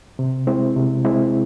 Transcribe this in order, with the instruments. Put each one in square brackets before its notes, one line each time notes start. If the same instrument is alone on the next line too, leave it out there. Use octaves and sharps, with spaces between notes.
[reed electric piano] C3
G#3 C4 E4
C3
G#3 C4 E4